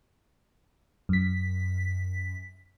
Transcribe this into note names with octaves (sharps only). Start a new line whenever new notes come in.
F#2 B6